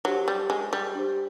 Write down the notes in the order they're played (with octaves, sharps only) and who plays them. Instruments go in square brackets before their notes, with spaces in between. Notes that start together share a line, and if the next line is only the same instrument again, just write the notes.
[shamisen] F#3 [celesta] D4 G4 C5
[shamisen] G3
G#3
G3
[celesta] D4 G4 C5